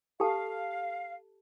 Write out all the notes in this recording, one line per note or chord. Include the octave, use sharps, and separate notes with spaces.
G4 A4 F5 A5